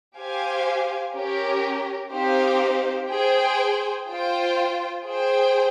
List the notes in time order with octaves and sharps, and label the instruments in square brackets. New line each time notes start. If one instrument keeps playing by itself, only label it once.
[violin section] G4 C5 F5 G#5
C#4 G4 A#4
C4 D#4 G4 C5 F5
G#4 C5 G5
F4 C5 G5
G#4 C5 G5